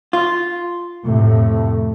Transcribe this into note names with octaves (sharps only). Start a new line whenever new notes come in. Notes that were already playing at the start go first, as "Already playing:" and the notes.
F4
F2 A2 C3 A3